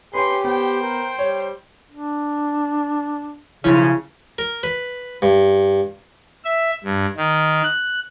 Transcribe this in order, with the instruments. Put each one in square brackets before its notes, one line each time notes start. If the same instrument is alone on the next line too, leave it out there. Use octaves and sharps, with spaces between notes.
[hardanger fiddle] C#4 C6 [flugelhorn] G4 [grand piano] B4 G5
[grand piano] B3 [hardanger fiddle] C5 G5
[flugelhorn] A#4
[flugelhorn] G3 [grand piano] C#5
[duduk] D4
[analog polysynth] B1 F3 C#4 [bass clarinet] C#3 [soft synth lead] E4
[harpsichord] A#4
B4
G2
[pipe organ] E5
G2
D#3
F#6